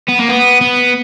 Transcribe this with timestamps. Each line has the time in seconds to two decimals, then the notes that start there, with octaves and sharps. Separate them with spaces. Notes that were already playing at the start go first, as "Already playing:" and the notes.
0.09 B3
0.19 A#3
0.29 B3
0.61 B3